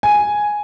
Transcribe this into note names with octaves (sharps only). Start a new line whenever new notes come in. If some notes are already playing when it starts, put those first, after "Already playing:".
G#5